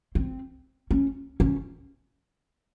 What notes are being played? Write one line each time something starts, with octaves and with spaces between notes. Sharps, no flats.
C4
C#4
C#4